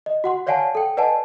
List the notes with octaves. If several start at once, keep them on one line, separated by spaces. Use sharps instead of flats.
D#5
F#4 F#5 C6
C#5 D5 F5 F#5 G#5 A5
A4 G5
B4 D5 D#5 F#5 G#5 A5